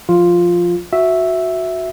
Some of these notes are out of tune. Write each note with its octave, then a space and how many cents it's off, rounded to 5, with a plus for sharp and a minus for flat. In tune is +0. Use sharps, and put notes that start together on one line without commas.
F3 +0 F4 +0
F#4 -10 E5 +0